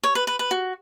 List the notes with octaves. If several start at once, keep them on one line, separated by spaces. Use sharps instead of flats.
C#5
B4
B4
B4
F#4